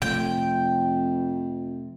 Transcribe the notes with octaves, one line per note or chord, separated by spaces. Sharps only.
F2 C3 A3 C4 G5